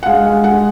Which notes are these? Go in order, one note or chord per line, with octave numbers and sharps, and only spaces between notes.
F#5
G#3 F5
G#3
G#3 F#5